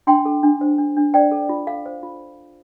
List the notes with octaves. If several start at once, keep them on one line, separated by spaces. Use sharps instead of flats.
D4 G5 C6
A4
D4
C5
D4
D4
C5 D5 G5
A4
F4
A4 F5
C5
F4